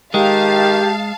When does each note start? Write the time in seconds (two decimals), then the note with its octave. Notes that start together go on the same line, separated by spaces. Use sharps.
0.14 D#3 G#3 G4 F5 A5